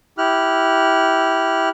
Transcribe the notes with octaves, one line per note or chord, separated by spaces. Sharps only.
E4 G4 F6 F#6